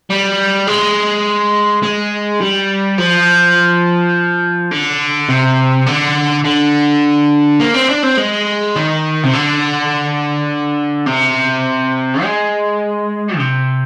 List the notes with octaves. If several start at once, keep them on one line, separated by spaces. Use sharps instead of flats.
G3
G#3
G#3
G3
F3
D3
C3
D3
D3
A#3
C4
D4
C4
G#3
D#3
C3
D3
C3
G#3
C3